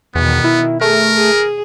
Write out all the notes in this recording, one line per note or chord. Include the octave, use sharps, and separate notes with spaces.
E2 B2 D#3 B3
E4
A3 G#4 A#4
G#4